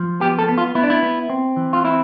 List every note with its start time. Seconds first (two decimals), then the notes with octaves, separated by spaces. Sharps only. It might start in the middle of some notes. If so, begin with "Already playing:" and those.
Already playing: F3
0.20 B3 G4
0.39 A4
0.48 B3
0.58 F4
0.75 B3 E4
0.83 D4
0.90 E4
1.03 B3
1.30 C4
1.57 E3
1.73 F4
1.84 C4 E4